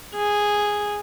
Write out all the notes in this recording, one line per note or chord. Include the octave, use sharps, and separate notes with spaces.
G#4